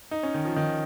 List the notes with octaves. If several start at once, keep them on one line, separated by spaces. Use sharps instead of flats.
D#4
C#4
D#3
F3
D#3